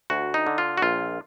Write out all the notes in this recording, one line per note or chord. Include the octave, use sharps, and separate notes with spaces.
D2 F#4
D#4
D3
F4
F#4
A#1 F4